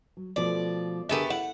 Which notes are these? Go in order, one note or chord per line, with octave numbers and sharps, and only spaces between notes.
F#3
B2 F3 A3 D5
D3 A3 B3 G4 G#4 A#4
E4 F#5